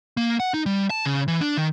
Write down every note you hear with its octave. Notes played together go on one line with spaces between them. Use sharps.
A#3
F#5
D#4
G3
A5
C#3
E3
D4
D#3